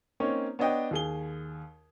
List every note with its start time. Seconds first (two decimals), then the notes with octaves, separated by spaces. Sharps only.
0.20 A#3 C4 C#4 D#4 C#5
0.59 B3 D4 C#5 D#5 G5
0.91 D#2 G#4 G7